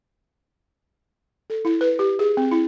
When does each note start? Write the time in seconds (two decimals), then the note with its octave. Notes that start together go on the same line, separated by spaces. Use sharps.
1.50 A4
1.65 E4
1.81 B4
1.99 G4
2.19 G#4
2.37 C4
2.51 E4